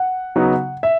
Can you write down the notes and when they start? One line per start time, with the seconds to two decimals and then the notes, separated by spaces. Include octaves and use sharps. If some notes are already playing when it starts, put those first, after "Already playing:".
Already playing: F#5
0.36 C#3 F#3 B3 D#4
0.83 E5